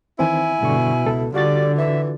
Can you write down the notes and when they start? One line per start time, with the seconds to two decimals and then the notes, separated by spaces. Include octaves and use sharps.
0.19 D#3 E3 C4 E4 G#5
0.62 G2 B2 D3 C#6
1.05 C#2 A4
1.34 D3 G3 F4 F#4 D5 A6
1.78 E3 E5